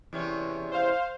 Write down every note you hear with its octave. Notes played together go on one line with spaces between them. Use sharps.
E2 C3 C#4
C5 F5